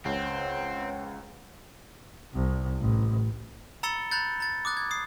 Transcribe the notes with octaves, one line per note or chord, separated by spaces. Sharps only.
C#2 C4 B4 C#5 F#5 G5
C2
A1
A#5 B5 E6 A6 C#7 G7
A#5 B5 F#6 G6 A6
A#5 A6
D6 D#6 F#6 A6
G#6
D#6 C7